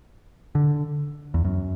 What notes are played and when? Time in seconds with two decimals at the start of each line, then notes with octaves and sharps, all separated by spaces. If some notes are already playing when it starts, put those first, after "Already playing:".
0.55 D3
1.34 E2
1.44 F#2